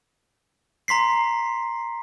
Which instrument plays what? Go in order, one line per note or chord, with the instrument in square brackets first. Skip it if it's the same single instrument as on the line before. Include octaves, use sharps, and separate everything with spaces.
[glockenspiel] A#5 C6 B6 C7